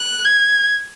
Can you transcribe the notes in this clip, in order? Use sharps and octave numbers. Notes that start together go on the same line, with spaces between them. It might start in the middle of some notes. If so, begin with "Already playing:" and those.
Already playing: F#6
G#6